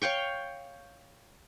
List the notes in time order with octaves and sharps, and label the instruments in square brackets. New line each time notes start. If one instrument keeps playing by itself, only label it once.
[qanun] C#5 F5 G5 C#6